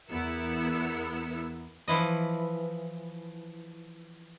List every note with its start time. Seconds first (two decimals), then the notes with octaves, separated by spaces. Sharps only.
0.10 E2 B3 E4 A#4 E6 C#7
1.88 E3 F3 E4 D#5